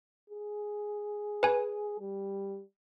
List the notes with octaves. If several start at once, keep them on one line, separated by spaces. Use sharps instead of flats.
G#4
B4 G#5
G3